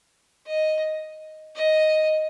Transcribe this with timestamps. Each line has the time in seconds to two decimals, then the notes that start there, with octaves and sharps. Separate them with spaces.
0.46 D#5
1.56 D#5